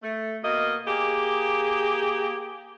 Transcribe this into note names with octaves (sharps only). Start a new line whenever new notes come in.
A3
B2 A#3 D#5
A#3 G4 G#4